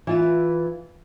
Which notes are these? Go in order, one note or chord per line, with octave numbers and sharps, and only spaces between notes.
E3 F4 E5